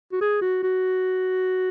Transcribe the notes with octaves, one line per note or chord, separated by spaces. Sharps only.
F#4
G#4
F#4
F#4